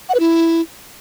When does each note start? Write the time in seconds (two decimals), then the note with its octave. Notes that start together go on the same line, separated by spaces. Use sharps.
0.09 F#5
0.14 B4
0.20 E4